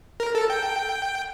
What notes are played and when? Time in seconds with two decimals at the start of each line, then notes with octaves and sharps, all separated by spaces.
0.20 A#4
0.35 A4
0.50 G5